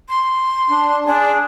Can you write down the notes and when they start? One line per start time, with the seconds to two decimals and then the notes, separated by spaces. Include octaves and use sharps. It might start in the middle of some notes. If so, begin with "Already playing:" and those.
0.09 C6
0.70 D4
1.06 D4 G#4